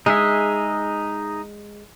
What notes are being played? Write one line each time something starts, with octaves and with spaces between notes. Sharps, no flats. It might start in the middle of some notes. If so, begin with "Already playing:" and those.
G#3 D#4 G#4 E5